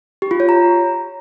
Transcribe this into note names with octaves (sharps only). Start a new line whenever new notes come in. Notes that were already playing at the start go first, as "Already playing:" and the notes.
G4
F4
C#5
A#5